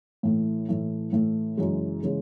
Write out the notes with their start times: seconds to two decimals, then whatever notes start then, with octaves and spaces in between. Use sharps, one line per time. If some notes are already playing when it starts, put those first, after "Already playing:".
0.23 A2 E3 A3
0.69 A2 E3 A3
1.13 A2 E3 A3
1.57 F#2 C#3 E3 G#3
2.03 C#3 E3 G#3